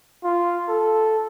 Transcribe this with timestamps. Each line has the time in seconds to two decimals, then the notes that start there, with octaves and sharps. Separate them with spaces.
0.24 F4
0.68 A4